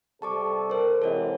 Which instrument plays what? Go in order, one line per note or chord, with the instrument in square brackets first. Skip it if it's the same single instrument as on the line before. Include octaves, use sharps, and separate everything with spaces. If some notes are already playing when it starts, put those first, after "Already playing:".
[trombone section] C3 G3 A4 [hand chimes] A5 C#6 D6
[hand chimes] A#4 C5
[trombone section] G#2 C3 E3 [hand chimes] A4 C#5 D#5